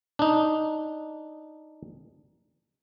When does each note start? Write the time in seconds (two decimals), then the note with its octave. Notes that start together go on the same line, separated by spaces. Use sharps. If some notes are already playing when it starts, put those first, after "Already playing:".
0.19 D4 D#4